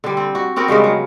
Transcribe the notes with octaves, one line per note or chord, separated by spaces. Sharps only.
D3 G3
C4
F#4
B3 C4 F#4 A#4
G2 C#3 G3 G#3
F#3